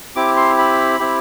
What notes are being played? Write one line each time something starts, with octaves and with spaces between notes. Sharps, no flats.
C4 E4 G4 D6
C6
B5
C4 E4 G4